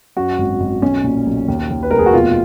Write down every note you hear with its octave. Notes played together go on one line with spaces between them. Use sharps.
F#2 F#4
G#1
G#1
B1 C#4
A#2
B1
D#2
D#2
B4
F1 A#4
G#4
F#4
B2 F4